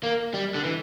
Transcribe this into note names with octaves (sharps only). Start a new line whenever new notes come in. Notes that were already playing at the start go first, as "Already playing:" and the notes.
A#3
G3
D3
E3